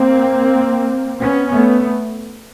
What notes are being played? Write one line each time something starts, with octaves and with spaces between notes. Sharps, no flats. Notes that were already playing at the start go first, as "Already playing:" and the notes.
Already playing: A#3 C4
B3 C#4
A3 B3